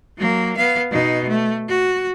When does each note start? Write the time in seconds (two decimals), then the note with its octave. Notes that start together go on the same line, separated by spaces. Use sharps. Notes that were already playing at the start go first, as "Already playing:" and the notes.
0.17 F#3 A#3
0.57 B3 F5
0.91 B2 D#4
1.29 A3
1.68 F#4